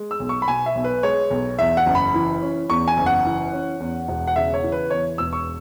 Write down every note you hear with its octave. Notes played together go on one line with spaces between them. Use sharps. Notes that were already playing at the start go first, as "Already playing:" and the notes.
Already playing: G#3
E6
B1
C#6
B5
B2 G#5
E5
B1
B4
G#3 C#5
B1
E2 E5
F#5
F#1
B5
E3
C#4
E2 C#6
G#5
F#1
F#5
E3
C#4
E2
E1
F#5
C#3 E5
C#5
E3
B4
E2 C#5
E1 E6
C#6